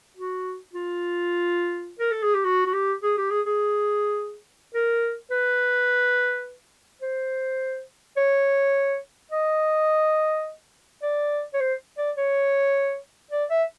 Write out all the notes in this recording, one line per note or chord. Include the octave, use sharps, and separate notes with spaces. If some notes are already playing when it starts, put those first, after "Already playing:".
F#4
F4
A#4
A4
G#4
G4
F#4
F#4
G4
G#4
G4
G#4
G#4
A#4
B4
C5
C#5
D#5
D5
C#5
C5
D5
C#5
D5
E5